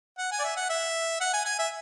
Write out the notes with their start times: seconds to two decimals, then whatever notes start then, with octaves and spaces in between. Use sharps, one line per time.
0.18 F#5
0.31 G#5
0.39 D5
0.44 E5
0.57 F#5
0.69 E5
1.20 F#5
1.33 G#5
1.45 G#5
1.59 E5